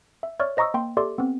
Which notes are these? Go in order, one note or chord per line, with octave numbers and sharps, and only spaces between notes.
E5
C#5 D5 E5 C#6 F6
C5 D#5 A#5 C#6 D#6 E6
A#3 G5 C6
G4 A4 D5 E5 C6 D6
B3 C4